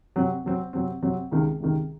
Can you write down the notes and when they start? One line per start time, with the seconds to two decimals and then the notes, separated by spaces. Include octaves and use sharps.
0.16 C3 F#3 C4
0.44 C3 F#3 C4
0.73 C3 F#3 C4
1.02 C3 F#3 C4
1.31 C#2 C3 D#3
1.60 C#2 C3 D#3